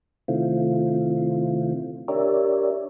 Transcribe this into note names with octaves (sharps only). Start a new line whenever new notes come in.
C3 D#3 A3 C4 E4 F4
D4 G4 A#4 C#5 D5 E5